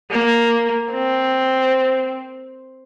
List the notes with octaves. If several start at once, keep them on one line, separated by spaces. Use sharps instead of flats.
A#3
C4